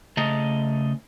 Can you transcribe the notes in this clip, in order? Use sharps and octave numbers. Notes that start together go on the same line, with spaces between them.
C#3 A3 D#5 A5 A#5